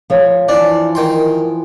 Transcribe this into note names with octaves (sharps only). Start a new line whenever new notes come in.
F3 C#5
E3 F3 D4
D#3 G5 C6